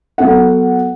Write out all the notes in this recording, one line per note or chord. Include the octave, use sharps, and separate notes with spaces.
F#3 B3 A4 F#5